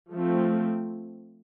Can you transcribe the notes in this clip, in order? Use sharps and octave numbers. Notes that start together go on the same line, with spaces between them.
F3 A3 C4